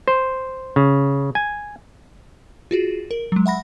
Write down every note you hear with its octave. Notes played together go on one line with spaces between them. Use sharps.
C5
C#3
G#5
F4 F#4 G#4
A#4
F#3 G#3
E5 F#5 B5 A#6